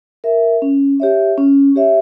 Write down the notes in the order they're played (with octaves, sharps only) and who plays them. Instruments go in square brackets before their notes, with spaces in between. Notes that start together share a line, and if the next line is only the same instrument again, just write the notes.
[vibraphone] A#4 E5
C#4
G4 C#5 E5
C#4
G4 C#5 E5